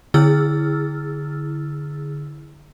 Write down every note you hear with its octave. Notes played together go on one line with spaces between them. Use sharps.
D3 E4 G#4 E6 F6 A6